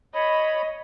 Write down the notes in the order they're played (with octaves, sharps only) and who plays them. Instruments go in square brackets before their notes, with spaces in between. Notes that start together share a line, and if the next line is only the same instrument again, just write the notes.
[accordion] C#5 B5 [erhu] D#5